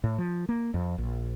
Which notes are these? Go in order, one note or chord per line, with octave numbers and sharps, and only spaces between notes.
A2
F3
A#3
F2
A#1